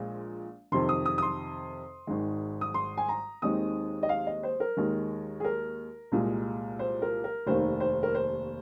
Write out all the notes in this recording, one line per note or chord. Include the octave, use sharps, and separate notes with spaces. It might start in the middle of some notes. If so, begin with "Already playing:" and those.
Already playing: A#1 A#2 F3 G#3
F2 C3 D#3 C6
D#6
D#6
D#6
C6
G#1 G#2 D#3 G#3
D#6
C6
G#5
A#5
D#2 D#3 G#3 C4 D#4 D#6
D#5
F5
D#5
C5
A#4
D#2 D#3 G#3
G#4
A#4
C2 A#2 G#3
C5
A#4
A#4
F1 D#2 D#3 A#3 C5
C5
A#4
C5